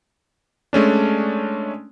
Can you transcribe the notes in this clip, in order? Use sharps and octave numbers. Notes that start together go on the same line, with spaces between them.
G#3 A3 C#4 D4